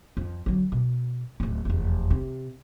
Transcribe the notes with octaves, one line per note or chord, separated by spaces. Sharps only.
F2
D3 F#3
B2
D1 F4
F1 E2
C3